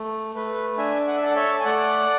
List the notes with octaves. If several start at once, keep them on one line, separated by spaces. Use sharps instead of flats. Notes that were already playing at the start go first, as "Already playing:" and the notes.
Already playing: A3
A3 B4
D4 E5 G#5
F#5
E5
A4 D5 F#5
C#5 E5
G#5
A3 D5 F#5